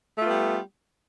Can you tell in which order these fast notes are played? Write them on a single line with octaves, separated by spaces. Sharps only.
A3 F4 B3 G3